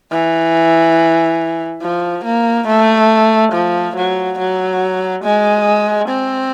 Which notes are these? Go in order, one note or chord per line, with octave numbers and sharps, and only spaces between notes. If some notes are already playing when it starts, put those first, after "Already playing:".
E3
F3
A#3
A3
F3
F#3
F#3
G#3
C4